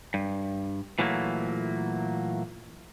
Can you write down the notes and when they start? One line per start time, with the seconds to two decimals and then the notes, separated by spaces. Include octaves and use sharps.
0.14 G2
0.99 A#2 E3 F#3 A3 A#3